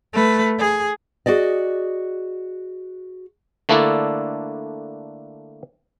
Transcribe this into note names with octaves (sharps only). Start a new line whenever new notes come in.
A3 B4
G#4
F#4 G#4 D5 D#5
D3 A3 A#3 D4 E4 A4